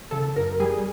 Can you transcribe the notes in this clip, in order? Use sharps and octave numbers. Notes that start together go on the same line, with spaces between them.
C#3 A4
F#2 A#4
G3 G#4